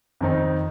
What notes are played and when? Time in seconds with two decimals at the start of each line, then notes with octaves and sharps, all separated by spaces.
0.21 F2 D#3 C4 D#4